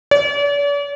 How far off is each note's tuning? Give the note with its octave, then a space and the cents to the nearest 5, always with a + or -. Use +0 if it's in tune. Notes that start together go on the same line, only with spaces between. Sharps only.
D5 -45